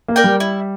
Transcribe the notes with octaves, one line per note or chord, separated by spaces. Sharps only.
A#3
A#4 D5 G5
G3
E4